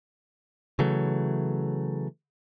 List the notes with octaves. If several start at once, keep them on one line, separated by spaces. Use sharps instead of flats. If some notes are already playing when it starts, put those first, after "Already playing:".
C#3 E3 F#3 A3